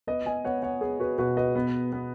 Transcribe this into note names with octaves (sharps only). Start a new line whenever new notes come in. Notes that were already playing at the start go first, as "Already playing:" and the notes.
B3 B4 D#5
D#5 G#5
B3 C#5 F#5
C#5 F#5
B3 G#4
F#4 B4
B2 F#4 B4
B4 D#5
B3
B3